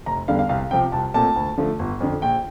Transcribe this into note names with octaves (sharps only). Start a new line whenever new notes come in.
F1 A#5
E2 D3 G3 F5
F5
C2 F5
C3 F3 C4 G5
C2 A5
A#2 A3 C4 A5
D2
D3 F3 A3
G1
F2 D3
A#1 G5